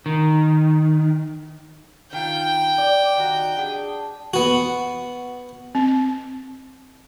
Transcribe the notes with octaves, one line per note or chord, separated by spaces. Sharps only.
D#3
D#3 F4 G5
D5
D#3 F#4
D4 G#4 G5
B3 F#4
C4